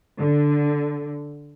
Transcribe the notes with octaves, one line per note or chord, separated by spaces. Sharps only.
D3